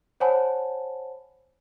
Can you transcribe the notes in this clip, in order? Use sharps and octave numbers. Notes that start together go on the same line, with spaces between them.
C5 C#5 F#5 G#5 A5 B5